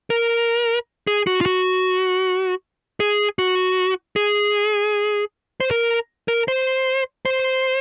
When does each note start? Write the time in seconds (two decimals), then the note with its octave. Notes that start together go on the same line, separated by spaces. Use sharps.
0.10 A#4
1.07 G#4
1.27 F#4
1.41 F4
1.46 F#4
3.00 G#4
3.39 F#4
4.16 G#4
5.60 C5
5.71 A#4
6.28 A#4
6.48 C5
7.25 C5